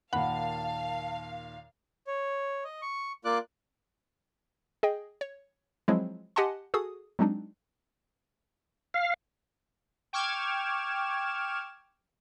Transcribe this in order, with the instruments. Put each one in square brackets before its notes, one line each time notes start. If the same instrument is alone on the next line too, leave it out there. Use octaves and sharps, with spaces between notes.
[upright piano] D#2 A#2 [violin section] F5 [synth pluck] F#5 B5 [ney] A5
[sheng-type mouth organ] C#5
D#5
C#6
A#3 F4 D5 D6 F#6
[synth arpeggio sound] G#4 D#5 G5
C#5
F3 F#3 G#3 C4 E4
G4 D#5 F#5 G#5 A5 C6
F#4 G#4 A4 D#6
F#3 G#3 C4 D4 D#4
[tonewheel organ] F5
[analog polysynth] G5 C#6 D6 F6 G#6 E7